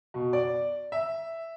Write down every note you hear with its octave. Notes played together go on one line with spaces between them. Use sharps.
B2
D5
E5